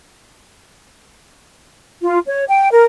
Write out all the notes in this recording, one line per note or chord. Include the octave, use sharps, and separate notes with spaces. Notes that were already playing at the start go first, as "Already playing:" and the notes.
F4
C#5
G5
A#4